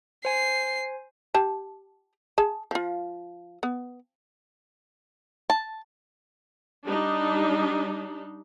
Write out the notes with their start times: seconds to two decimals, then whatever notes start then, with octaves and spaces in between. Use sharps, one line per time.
0.25 C5 G#5 C7
1.34 G4 A5
2.38 G#4 A5
2.71 F3 F4
3.63 B3
5.50 A5
6.85 G3 D4 D#4